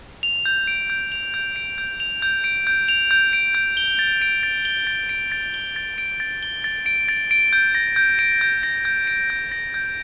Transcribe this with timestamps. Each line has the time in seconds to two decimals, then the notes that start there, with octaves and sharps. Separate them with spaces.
0.23 F7
0.45 G6
0.67 D7
0.90 G6
1.12 F7
1.34 G6
1.56 D7
1.78 G6
2.00 F7
2.22 G6
2.44 D7
2.67 G6
2.88 F7
3.11 G6
3.33 D7
3.55 G6
3.77 G7
3.99 A6
4.22 D7
4.43 A6
4.65 G7
4.87 A6
5.09 D7
5.32 A6
5.54 G7
5.76 A6
5.98 D7
6.20 A6
6.43 G7
6.64 A6
6.86 D7
7.09 A6
7.31 D7
7.53 G6
7.75 A#6
7.96 G6
8.19 D7
8.41 G6
8.63 A#6
8.85 G6
9.07 D7
9.30 G6
9.52 A#6
9.74 G6